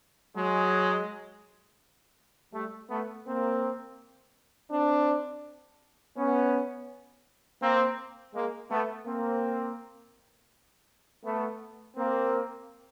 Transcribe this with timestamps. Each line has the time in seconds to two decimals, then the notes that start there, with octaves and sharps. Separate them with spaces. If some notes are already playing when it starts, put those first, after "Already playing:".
0.36 F#3 G#3
2.54 G3 A3
2.90 A3 B3
3.27 A#3 C4
4.71 C4 D4
6.17 B3 C#4
7.62 A#3 C4
8.34 G#3 A#3
8.70 A3 B3
9.06 A#3 C4
11.24 A3 B3
11.97 A#3 C4